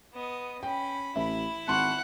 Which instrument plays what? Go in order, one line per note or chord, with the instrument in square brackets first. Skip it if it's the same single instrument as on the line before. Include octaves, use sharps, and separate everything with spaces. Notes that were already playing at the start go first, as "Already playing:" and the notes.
[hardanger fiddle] B3 D#5
[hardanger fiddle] C#4 B5 [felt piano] G5
[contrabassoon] A1 [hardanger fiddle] E4 B5 [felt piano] E5
[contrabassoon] G#1 [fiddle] F#5 F#6 [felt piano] A5 C6 C#6